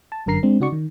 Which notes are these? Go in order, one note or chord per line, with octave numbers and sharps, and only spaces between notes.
A5
G1 F#2 D3 A#4 A#5 C7
G#3 C4 D4
C#3 D#4 F#4 D5 C#6
D#3